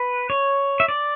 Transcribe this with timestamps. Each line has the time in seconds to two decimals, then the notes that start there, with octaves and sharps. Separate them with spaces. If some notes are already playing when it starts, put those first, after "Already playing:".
Already playing: B4
0.30 C#5
0.80 E5
0.88 D5